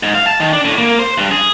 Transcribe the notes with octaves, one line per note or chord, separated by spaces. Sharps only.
G#2
F5
A5
D#3
D4
A2
A#3
C5
G2
G#4